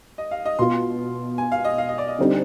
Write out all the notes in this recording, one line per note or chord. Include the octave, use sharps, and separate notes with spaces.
D#5
F5
D#5
B2 B3 F4 C6
G#5
F5
D#5
F5
D#5
D5
D#5
D3 G3 C4 D#4